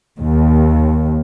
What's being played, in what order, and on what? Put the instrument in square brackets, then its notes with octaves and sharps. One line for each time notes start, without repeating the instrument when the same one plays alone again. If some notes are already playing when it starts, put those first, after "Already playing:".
[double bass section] D#2